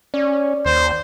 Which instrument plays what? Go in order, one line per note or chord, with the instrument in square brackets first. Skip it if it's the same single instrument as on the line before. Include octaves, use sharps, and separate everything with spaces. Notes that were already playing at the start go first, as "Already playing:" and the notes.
[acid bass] C#4 [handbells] D5
[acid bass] D#2 [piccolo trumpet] C5